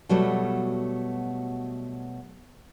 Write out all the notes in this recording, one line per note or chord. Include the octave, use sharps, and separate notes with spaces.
B2 F#3 G3 A3